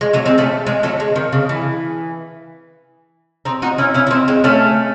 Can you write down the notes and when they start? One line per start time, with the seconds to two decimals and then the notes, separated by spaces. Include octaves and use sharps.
0.01 G#3
0.13 F#3 A3
0.25 G#3 C4
0.38 A3 C#4
0.67 G#3
0.83 F#3 A3
1.00 G#3
1.16 D#3
1.33 C#3
1.49 E3
3.45 C4 D#4
3.62 D#4 F#4
3.78 C#4 E4
3.94 C#4 E4
4.07 E4
4.11 C4 D#4
4.28 G#3 C4
4.44 A3 C#4